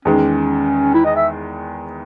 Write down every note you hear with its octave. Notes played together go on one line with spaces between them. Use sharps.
E2 D#3 G#3 C#4
E4
D#5
E5